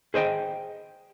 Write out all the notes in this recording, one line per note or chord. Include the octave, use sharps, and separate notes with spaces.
G#4 C5 D#5 G5